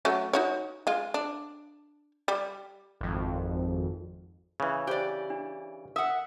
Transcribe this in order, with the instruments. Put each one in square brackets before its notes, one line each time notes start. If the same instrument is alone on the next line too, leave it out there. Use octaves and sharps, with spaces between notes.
[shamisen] F#3 A3 C#4
D#4 F#4 C#5
G#3 F4
D4
G3
[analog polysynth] G#1 F2
[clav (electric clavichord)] C#3 E3
[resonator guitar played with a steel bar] G4 D5 [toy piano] C5
[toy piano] D4
[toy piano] A#4 D#6 [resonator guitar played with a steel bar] E5 F#5